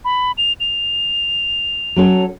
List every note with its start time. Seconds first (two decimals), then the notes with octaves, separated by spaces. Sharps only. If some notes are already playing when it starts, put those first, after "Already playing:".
0.05 B5
0.38 F7
0.60 F7
1.96 F#3 C#4 A4